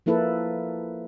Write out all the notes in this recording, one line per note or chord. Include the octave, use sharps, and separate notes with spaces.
F3 A#3 E4 A4 B4